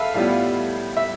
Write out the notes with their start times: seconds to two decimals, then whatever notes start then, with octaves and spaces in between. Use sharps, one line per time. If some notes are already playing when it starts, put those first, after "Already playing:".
Already playing: A4 B4 E5 F5
0.14 A2 G3 B3 F4 F5
0.97 E5